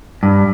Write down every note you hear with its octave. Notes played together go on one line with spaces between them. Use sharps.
G2